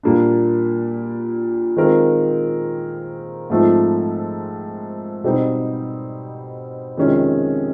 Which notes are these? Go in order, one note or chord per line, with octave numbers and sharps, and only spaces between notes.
A#2 G3 A#3 D4
D#3 G#3 C4 F4 A#4
G#2 F3 A3 C4 D#4
B2 G3 C4 D#4
F2 C3 D#3 G#3 C#4